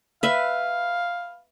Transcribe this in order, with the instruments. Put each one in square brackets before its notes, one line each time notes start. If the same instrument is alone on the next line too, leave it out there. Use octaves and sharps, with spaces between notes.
[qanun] B4 E5 [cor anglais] F5